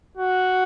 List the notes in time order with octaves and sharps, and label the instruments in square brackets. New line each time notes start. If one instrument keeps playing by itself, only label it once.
[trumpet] F#4